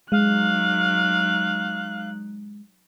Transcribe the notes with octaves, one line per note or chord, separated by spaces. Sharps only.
F#3 G#3 D#4 F5 F#6